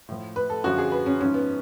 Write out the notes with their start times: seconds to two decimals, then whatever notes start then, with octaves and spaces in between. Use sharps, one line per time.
0.09 A2 F3
0.36 B4
0.50 A4
0.64 F#2 D3 F3 F#4
0.78 G#4
0.92 B4
1.06 C#4
1.21 G#2 F3 C#4
1.34 B3